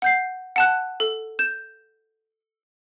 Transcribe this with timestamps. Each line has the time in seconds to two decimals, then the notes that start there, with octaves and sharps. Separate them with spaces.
0.02 F#5 G6 C7
0.56 F#5 A5 F#6
1.00 A4
1.39 G6 E7